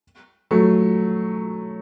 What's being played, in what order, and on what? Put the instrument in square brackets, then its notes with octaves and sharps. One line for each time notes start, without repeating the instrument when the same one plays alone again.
[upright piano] F#3 A3